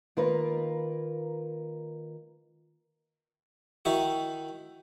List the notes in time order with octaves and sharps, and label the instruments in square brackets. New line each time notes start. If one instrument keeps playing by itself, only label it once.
[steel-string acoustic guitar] D#3 A#3 F4 A#4 B4
[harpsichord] D#3 D#4 E4 F#4